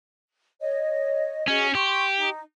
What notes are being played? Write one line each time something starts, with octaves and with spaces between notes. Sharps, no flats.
C#5 D#5
C#4 F#4 G#4 D#5
G4 C6 C#6
D#4